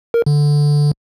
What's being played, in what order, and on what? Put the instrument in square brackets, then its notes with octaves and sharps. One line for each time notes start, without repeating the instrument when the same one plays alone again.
[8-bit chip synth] A#4
D3